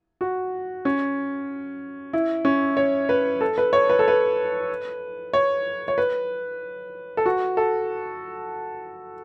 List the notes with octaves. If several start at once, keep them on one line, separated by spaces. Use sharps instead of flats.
F#4
C#4
E4
C#4
C#5
B4
A4
B4
C#5
B4
A4
B4
C#5
C#5
B4
A4
F#4
A4